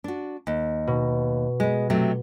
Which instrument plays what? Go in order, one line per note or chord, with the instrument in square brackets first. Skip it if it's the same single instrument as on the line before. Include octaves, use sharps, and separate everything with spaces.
[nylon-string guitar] D4 F#4
D#2
[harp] B2
[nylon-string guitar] G#3 B3
C3 F#3 A3